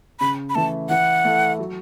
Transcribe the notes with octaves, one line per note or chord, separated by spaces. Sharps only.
C#3 B5
B5
E3 A3 A5
E3 F#5
A3 E4 A4
F#3